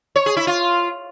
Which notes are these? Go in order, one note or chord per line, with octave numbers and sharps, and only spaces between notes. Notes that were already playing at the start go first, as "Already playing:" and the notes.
C#5
G#4
E4
F4